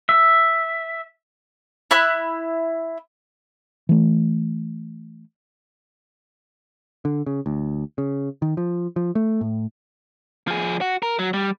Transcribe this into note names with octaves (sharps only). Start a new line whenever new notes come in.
E5
E4 E5 B5 F#6
E3 A3
D3
C#3
D2
C#3
D#3
F3
F3
A3
A2
F3 G#4
F#4
A#4
F#3
G3